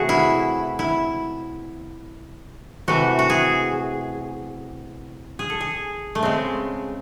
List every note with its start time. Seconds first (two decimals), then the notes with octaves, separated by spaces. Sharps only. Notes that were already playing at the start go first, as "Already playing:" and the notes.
Already playing: C3 E3 A3 F#4 G#4
0.09 E4
0.79 E4
2.88 C3 E3 A3 F#4
3.19 F#4
3.30 G#4
5.39 G#4
5.50 A4
5.61 G#4
6.15 A3
6.23 C#3 G#3 C4